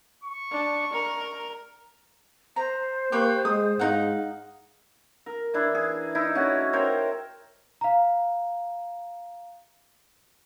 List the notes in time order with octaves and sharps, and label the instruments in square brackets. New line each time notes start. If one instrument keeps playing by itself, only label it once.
[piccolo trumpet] C#6
[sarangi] D4
A#4
[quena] C5 [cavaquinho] A#5
[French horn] A#3 [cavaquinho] G4 B4 C#6
[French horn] G#3 [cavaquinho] D#6
[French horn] G#2 [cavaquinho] D#4 F5 F#5
[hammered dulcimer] A#4
E3 D4 E4
G#4
D#4 E4
A3 C#4 F#4
A#4 C5 C#5 G5
[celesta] F5 A#5